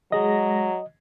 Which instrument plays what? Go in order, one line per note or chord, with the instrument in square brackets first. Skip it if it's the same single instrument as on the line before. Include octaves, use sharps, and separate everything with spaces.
[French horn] F#3 [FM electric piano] G#3 A#6 [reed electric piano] D#5